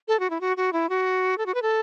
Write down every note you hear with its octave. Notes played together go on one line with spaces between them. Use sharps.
A4
F#4
E4
F#4
F#4
E4
F#4
A4
F#4
B4
A4